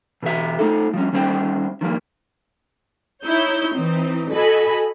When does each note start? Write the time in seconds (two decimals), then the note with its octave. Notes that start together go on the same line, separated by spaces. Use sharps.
0.23 B2 E3 G4 E5
0.59 A3 D#4 A4
0.94 F3 G3 C#4
1.13 D#3 G3 C#4 C5 G5
1.81 D#3 F3 G3 A#3
3.24 D#4 E4 C#5 G6
3.74 E3 C4 D#4
4.33 F#4 A4 D#5 G#5 B5